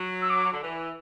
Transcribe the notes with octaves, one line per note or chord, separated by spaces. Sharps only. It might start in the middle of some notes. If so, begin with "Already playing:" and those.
Already playing: F#3
E6
D6
D3
E3